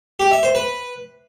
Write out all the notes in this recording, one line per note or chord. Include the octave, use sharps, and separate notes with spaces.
G4
E5
C5
B4